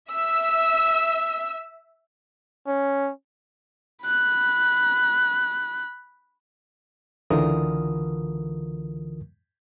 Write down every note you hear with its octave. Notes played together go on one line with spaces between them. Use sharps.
E5 E6
C#4
B5 F#6
C#2 D3 E3 F4 A#4 D#6